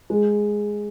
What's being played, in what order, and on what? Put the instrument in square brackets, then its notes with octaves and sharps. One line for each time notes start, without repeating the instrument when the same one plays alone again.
[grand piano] G#3